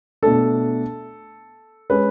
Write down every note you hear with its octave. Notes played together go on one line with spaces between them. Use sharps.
B2 A3 D4 A4
G#3 C#4 B4